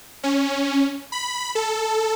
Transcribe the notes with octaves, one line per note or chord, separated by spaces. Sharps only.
C#4
B5
A4